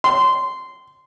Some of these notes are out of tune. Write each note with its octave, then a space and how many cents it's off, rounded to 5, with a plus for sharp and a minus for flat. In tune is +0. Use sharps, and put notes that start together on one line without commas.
C6 -15